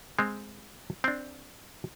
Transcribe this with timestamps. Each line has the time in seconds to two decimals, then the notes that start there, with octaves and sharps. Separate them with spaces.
0.18 G#3 C4
1.04 C4 D4